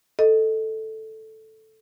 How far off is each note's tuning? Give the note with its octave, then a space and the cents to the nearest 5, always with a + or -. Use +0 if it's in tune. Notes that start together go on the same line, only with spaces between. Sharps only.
A4 +0 D#5 +0